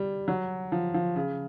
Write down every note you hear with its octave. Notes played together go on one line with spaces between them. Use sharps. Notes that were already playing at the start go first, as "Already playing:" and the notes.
Already playing: G3
F#3
F3
F3
C#3